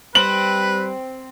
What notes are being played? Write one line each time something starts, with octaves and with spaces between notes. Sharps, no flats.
G3 C4 B4 F#7